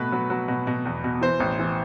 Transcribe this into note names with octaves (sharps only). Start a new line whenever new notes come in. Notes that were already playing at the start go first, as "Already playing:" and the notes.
Already playing: B2 A3 B4
F#3
F#3
B2
B2
E2
B2
E3 C5
A1
E3